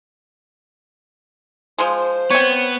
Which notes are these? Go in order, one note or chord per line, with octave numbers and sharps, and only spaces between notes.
F3 G#3 C5
B3 C4 C#5